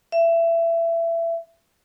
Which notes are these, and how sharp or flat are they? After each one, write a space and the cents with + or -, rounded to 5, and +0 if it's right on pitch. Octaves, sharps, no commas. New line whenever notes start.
E5 +25